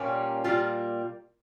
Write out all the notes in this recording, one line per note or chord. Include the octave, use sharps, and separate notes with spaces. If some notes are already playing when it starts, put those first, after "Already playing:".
Already playing: A#2 G3 A#3 C#4
A#2 G3 A#3 F4